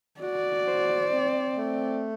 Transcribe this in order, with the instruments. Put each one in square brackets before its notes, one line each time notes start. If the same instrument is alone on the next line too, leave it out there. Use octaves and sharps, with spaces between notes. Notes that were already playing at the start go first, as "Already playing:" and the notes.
[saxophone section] F#4 [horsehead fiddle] D5
[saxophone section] C5
C4
A3